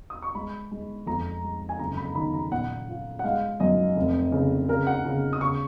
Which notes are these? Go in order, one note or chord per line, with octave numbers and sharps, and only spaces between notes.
D#6
C#6
G#3 B5
G#3
F2 A#5
G#3
G#5
F#1 A#5
B5
D#3 B5
A#5
A#2 F#5
F4
F#5
G#3 F5
F#2 D#5
F1
C#3
C#3 A#4
F#5
C#3
D#6
C#3 C#6